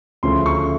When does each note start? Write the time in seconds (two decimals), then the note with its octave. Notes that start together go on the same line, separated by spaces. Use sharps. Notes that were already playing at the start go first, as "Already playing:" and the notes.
0.23 D2 C#3 F3 A3 C#4 C6
0.46 C#6